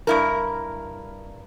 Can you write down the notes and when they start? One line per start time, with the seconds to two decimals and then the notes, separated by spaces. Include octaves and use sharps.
0.07 G2 E4 A#4